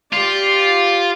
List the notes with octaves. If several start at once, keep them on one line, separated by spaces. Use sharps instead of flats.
F4 G4 D5